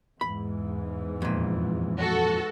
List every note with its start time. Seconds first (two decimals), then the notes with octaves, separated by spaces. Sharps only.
0.21 E2 G#2 E3 B5
1.22 F2 A#2
1.97 F#4 A4